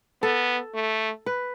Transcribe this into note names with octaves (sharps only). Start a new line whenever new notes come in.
B3 A4
A3
B4